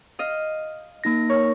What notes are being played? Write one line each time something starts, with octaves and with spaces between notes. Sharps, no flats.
D#5 F5
A#3 D#4 A#6
A#4 C#5